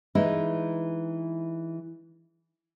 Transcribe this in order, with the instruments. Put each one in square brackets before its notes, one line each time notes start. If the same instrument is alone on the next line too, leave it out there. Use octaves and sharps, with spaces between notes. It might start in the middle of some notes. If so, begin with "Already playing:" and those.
[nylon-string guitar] E3 G#3 D#4 E4